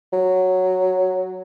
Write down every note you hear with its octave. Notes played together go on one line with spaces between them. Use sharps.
F#3